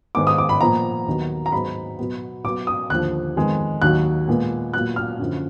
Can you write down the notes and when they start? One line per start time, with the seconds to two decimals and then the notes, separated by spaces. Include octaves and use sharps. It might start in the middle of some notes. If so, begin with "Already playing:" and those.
0.15 G#2 D#3 G#3 B3 D6
0.27 D#6
0.38 D6
0.49 B5
0.61 A#2 F3 B3 A#5
1.07 D#2 D#3 F#3 B3
1.46 A#5
1.52 G#2 F#3 B3 B5
1.99 B2 F#3 B3
2.44 B2 F#3 B3 D6
2.67 D#6
2.90 D#2 D3 F3 F#6
3.36 F2 D#3 G#3 B3
3.82 D#2 D#3 F#3 F#6
4.28 A#2 G#3 B3
4.74 A#2 F#3 B3 F#6
4.96 F6
5.20 F#2 D3 F3